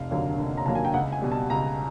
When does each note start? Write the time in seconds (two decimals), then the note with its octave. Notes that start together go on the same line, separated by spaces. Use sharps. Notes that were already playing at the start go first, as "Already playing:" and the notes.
Already playing: F1 F5
0.10 D#2 D3 F#3 A#3
0.38 F1
0.57 A#5
0.66 D#2 D3 F#3 A#3 A5
0.75 G#5
0.85 G5
0.94 C#2 F#5
1.12 G#5
1.22 B2 G3
1.32 A5
1.50 C#2 A#5